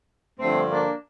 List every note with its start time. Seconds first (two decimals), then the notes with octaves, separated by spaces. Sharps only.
0.39 G2 D3 F3 A3 C4
0.70 A#3 D4